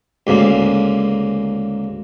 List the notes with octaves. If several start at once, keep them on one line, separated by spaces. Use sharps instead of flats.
D2 G#2 C#3 A#3